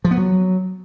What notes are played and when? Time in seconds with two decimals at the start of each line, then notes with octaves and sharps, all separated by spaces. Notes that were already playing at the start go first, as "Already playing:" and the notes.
0.04 F3
0.11 B3
0.17 F#3